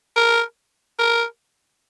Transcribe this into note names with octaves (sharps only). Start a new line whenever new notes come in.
A#4
A#4